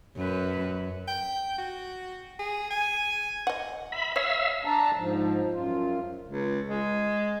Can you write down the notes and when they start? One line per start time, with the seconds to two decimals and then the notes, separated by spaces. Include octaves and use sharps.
0.16 F#2 B4
1.08 G5
1.58 F#4
2.39 G#4
2.70 G#5
3.47 D#5 F#5
3.92 E5 B5
4.16 C#5 E5 F5 E6
4.65 D4 A5 A#5
4.97 G#2 F3
5.53 F#2 F4
6.28 C#2
6.68 G#3